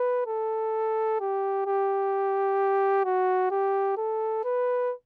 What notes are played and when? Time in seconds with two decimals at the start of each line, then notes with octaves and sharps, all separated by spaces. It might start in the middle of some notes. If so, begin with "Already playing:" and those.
Already playing: B4
0.27 A4
1.20 G4
1.66 G4
3.05 F#4
3.51 G4
3.97 A4
4.44 B4